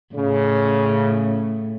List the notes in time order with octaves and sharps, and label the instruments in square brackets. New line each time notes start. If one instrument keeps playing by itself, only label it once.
[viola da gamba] A2 [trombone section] C#3